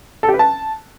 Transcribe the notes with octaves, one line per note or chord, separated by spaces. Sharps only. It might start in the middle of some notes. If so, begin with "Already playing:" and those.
A4
G4
B4
A5